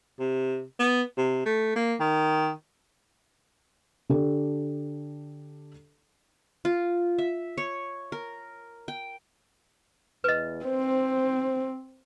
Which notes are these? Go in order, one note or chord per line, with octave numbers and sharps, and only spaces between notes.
C3
B3
C3
A3
A#3
D#3
D3 D4 G4 A4
F4
E5
C#5
A#4
G5
E2 B4 D#5
C4 C5